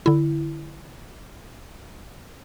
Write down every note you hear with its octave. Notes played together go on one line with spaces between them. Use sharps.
D3 E4